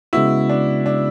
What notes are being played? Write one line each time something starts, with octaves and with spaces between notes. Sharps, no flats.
C#3 G#3 B3 E4 F#4
D4
D4